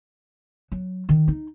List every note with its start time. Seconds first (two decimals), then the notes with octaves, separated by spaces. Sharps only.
0.72 F#3
1.09 D#3
1.28 D#4